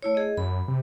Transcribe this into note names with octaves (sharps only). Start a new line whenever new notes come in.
A3 E4 C#5
G#4 D#5
F#2 B5
C3